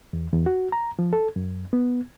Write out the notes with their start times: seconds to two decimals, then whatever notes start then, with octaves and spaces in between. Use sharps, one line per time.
0.13 E2
0.33 E2
0.46 F#4
0.72 A#5
0.99 F3
1.13 A4
1.36 F#2
1.73 B3